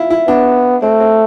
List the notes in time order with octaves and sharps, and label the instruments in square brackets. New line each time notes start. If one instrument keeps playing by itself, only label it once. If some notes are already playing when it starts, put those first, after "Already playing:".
Already playing: [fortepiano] E4 F4
E4
[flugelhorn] B3 [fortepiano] D4
[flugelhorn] A3 [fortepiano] C4
[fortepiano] C4